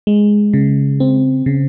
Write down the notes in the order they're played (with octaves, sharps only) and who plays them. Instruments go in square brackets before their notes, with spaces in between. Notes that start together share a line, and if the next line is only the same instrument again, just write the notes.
[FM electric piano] G#3
C#3
C4
C#3